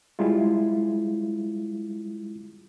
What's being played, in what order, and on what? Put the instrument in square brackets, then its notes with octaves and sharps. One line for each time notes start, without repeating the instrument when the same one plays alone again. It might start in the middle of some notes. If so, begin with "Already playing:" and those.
[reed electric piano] G3 G#3 E4 F4